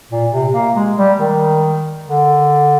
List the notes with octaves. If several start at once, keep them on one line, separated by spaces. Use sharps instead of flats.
A#2
C3
A#3
G#3
G3
D#3
D3